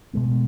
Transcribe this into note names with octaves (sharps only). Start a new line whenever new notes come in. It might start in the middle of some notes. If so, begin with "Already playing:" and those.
B2 G#3 B3